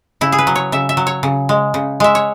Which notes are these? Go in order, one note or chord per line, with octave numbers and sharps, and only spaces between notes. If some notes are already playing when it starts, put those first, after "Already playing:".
C#3 E4
G#4
B4
F#3
C#5
C#3 E5
E5
F#3
C#5
C#3
G#3
C#3
G#3 E5
C#5